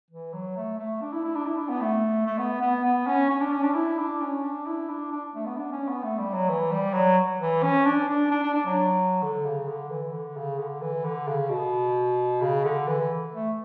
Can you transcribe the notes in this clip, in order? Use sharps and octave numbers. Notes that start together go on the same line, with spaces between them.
E3
F#3
A3
A3
D4
E4
E4
D4
E4
D4
B3
A3
A3
B3
B3
B3
C#4
C#4
D4
C#4
D4
E4
D4
C#4
D4
E4
D4
D4
A3
B3
D4
C#4
B3
A3
G3
F#3
E3
G3
F#3
E3
C#4
D4
D4
D4
D4
D4
F#3
D3
C#3
D3
E3
D3
C#3
D3
E3
D3
C#3
B2
C#3
D3
E3
A3